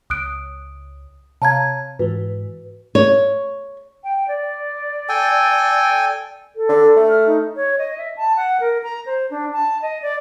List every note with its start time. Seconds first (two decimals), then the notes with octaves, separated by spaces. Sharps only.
0.10 C#2 D#6 F#6 D7
1.42 C3 C#5 F5 A5 A#5 G#6
1.99 G#2 E3 F#4 B4
2.95 C#5
4.04 G5
4.28 D5
5.09 A4 G5 G#5
6.56 A4
6.69 D3
6.97 A3
7.09 F6
7.27 D#4
7.56 C#5
7.78 D#5
7.98 E5
8.17 A5
8.36 F#5
8.60 A#4
8.83 A#5
9.06 C5
9.31 D4
9.53 A5
9.82 D#5
10.02 D5